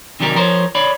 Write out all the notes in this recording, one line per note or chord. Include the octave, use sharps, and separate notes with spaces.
C3 D#3 F#3 G3 G4 A#4
F3 A#4 C5 C#5
C#5 D5 B5